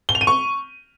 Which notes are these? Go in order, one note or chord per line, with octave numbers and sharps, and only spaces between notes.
G7
F7
D#7
C#6